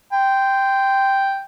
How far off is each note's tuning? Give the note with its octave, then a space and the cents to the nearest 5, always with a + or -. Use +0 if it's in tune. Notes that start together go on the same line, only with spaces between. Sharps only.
G5 +0 C6 -20